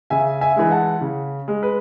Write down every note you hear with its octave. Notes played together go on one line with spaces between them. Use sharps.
C#3 E5 G#5
E5 G#5
E3 G#3 G#5
F#5 A5
C#3
G#3
B4